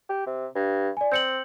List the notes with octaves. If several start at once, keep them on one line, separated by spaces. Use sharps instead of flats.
G4
C3
G2
D5 G#5
C4 G6 C#7 F#7